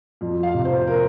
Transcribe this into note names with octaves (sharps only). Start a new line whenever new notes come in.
F2
F5
C3
C5
A#4